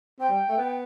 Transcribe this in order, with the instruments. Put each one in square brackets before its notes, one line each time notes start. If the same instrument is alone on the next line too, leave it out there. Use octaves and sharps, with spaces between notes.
[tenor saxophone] C4 [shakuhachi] G5
[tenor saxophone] G3
A3
B3